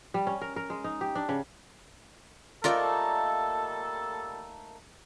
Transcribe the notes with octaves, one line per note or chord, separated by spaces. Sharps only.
G3
C#4
A#4
A#4
G#3
D#4
G4
D4
C#3
G3 A3 A#3 D#4 F4 A4 A#4 D5